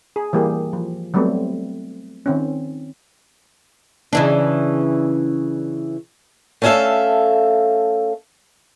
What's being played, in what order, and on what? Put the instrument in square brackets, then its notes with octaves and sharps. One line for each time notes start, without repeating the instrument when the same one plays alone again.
[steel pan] G#4
E3 G3 A#3 G4 G#4
F3
F#3 G3 A3 B3 C4
D#3 C4 C#4
[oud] C#3 E3 D4
[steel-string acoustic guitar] A3 B3 C#4 A4 E5 F5